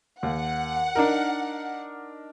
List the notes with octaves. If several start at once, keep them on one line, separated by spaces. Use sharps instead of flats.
D#2 F#5
D4 D#4 A#4